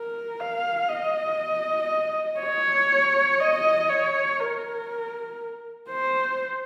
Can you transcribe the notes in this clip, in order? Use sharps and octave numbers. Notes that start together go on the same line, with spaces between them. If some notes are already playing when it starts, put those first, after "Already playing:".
Already playing: A#4
F5
D#5
C#5
D#5
C#5
A#4
C5